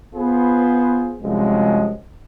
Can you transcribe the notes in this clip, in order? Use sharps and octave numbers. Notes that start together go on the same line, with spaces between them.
B3 F4 G#4 B4 C5
C2 F#2 F3 G#3